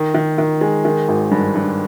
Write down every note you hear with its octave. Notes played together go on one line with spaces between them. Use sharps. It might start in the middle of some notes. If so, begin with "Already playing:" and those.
Already playing: D#3
D#3
D#3
G#3
D#3
G#1
G2
G2